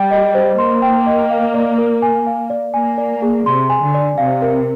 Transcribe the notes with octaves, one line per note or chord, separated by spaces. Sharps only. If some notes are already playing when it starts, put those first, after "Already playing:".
Already playing: G3 G5
D#5
C5
A#3 C6
G5
D#5
F5
D5
A#4
G#5
F5
D5
A#3 G#5
D5
G#4
C3 C6
G#5
D3
D5
C3 F5
A#4